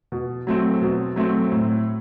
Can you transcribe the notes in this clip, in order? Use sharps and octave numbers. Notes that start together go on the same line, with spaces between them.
B2
F#3 A3 C4
B2
F#3 A3 C4
A2